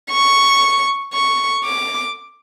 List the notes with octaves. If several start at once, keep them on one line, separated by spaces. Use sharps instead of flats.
C#6
C#6
D6